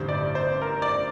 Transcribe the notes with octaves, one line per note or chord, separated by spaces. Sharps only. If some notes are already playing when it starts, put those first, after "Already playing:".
Already playing: A1 G2 D3 G3 C5
D5
C5
A#4
D5